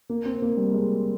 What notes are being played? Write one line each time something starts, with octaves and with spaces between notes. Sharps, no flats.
A#3
C4
A#3
G3
G#3